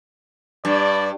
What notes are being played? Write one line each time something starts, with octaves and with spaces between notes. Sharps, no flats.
G2 D5